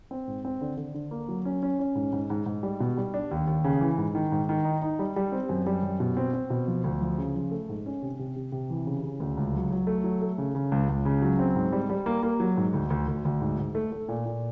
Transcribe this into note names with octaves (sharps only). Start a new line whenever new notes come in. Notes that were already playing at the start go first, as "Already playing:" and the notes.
C4
G#2
C4
D3
D3
D3
A#3
F#3
C#4
C#4
C#4
G#2
G#2
G#2
G#2
G3
B2
G3
D4
D#2
D#2
C#3
E3
G#2
D#3
G#2
D#3
D#4
D#4
G3
G3
C4
F#2
G3
F#2
B2
C4
C4
B2
F3
D2
F3
C#3
F3
A3
G#2
C#4
C3
C3
C3
C3
E3
C#3
C#3
D2
C#2
F#3
F#3
A3
F#3
A3
C#3
C#3
C#2
C#2
C#3
F#3
C4
G#2
G3
G3
A#3
A#3
F#3
G#2
D2
D2
D2
D2
G#2
G#2
A3
A3
A#2
A#2